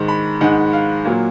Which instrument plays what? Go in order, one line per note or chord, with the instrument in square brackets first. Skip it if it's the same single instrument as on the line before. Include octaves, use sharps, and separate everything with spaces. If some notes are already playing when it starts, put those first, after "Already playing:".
Already playing: [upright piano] G#2 D#3 G#3
B5
G#2 D#3 G#3 F#5
F5
A#2 F#3 A#3